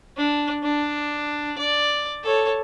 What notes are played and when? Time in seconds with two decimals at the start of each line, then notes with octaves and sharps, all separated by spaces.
0.17 D4
0.63 D4
1.58 D5
2.23 A4 C#5